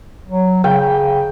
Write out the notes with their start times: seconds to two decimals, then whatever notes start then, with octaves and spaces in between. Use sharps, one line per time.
0.28 F#3
0.64 C#3 G5